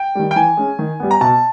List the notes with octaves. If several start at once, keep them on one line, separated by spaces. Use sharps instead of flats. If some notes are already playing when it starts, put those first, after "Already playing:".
Already playing: G5
D#3 G3
G5
E3 G#5
G#3 C#4
D#3
G3 B3
A#5
B2 A5